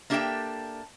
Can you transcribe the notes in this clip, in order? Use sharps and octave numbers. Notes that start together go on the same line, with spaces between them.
A#3 D4 G4 A4 E5 G5